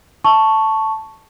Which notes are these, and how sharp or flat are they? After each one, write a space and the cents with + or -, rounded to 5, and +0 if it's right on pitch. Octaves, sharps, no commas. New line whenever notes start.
A5 +0 C#6 +0